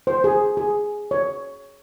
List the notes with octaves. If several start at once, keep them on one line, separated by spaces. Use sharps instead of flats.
C5
G#4
G#4
C#5